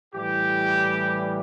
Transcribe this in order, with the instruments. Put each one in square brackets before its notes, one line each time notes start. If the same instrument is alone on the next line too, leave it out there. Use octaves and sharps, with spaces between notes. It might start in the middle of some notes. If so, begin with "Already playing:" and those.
[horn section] A2 E3 G3 G4